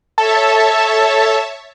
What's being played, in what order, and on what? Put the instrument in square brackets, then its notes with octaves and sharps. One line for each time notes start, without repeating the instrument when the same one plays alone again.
[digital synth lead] A4 [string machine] C#5 E5 A5